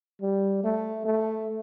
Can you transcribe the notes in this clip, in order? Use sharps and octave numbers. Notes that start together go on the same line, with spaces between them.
G3
A3
A3